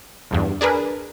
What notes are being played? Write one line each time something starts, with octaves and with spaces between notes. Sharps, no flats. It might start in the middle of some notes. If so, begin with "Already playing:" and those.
G1 E2 G2
D4 G#4 A#4 B4